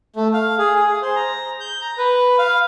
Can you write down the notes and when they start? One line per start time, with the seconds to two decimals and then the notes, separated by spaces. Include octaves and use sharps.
0.16 A3
0.33 F5
0.58 G#4
0.76 G#4
1.02 C5
1.16 A#5
1.60 G6
1.82 A#5
1.98 B4
2.39 F5